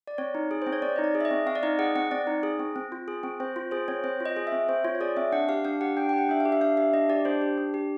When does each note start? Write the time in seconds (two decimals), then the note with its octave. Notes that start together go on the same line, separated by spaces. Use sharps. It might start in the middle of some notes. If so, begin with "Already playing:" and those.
0.07 D5
0.18 C4 C#5
0.35 D#4
0.51 G#4
0.62 C4 C5
0.73 C#5
0.82 C4 D5
0.96 D#4 D#5
1.04 D5
1.15 G#4
1.21 E5
1.25 D#5
1.31 C4
1.47 C4 F5
1.55 D5
1.63 D#4 D#5
1.79 G#4 F#5
1.95 C4 F#5
2.11 C4 D5
2.27 D#4
2.43 G#4
2.59 C4
2.76 C4
2.92 F4
3.08 G#4
3.23 C4
3.40 C4 C5
3.56 F4
3.71 G#4 C5
3.88 C4 C#5
4.04 C4 C5
4.20 F4
4.26 D#5
4.36 G#4
4.47 E5
4.52 C4
4.68 C4 C5
4.84 F4 C#5
4.95 C#5
5.01 G#4 D5
5.17 C4 E5
5.32 D4 F#5
5.49 G4 F5
5.65 D4 F5
5.81 G4 F#5
5.97 D4 G5
6.09 G4 G5
6.18 F#5
6.29 D4 E5
6.40 F5
6.45 G4
6.52 E5
6.61 D4 F5
6.77 G4 E5
6.93 D4 D#5
7.09 G4 D5
7.25 D4 C5
7.42 G4
7.58 D4
7.74 G4